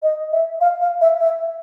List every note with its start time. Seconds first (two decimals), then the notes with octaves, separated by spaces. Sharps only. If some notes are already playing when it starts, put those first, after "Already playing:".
0.02 D#5
0.32 E5
0.61 F5
0.81 F5
1.01 E5
1.19 E5